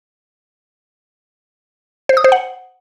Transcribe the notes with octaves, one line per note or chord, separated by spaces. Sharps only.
C5
D#6
C5
F#5